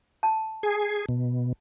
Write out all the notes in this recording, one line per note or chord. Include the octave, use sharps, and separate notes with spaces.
A5
G#4
B2